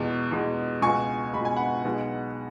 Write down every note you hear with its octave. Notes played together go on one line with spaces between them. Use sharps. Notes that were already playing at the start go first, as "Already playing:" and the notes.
Already playing: E2 B2 G#3
E2 B2 G#3
C#2 B2 G#3 G#5 C#6
C#2 B2 G#3 B5
G#5
F#5 B5
B1 B2 G#3